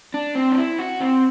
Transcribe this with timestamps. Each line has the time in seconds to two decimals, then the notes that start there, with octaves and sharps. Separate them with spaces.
0.14 D4
0.35 C4
0.51 D4
0.57 E4
0.79 F#4
1.00 C4